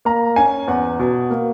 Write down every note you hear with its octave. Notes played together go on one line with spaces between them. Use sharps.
A#3 A#5
C#4 G#5
E2 F#5
B2
A#3